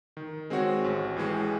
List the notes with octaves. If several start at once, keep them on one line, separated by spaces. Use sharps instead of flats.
D#3
G#3 C4 F#4 C#5
A1
A2 E3 G#3